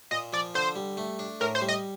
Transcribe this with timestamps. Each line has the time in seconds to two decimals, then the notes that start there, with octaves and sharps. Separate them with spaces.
0.11 A#2 D#5
0.33 F3 D5
0.54 D3 C5
0.75 G3
0.97 A3
1.19 D4
1.40 A2 A#4
1.55 C5
1.61 G3
1.68 D#5